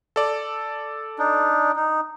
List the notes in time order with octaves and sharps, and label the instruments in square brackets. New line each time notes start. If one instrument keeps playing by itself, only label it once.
[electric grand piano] A4 D5
[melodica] D4 D#4
D#4